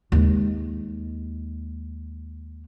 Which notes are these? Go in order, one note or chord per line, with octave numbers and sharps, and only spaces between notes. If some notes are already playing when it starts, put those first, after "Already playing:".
D#2 G#3